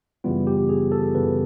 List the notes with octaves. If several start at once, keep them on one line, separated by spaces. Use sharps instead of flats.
F#2 C#3 E3 G3 B3 F4
G4
G#4
A4
F#2 C#3 E3 G3 B3 B4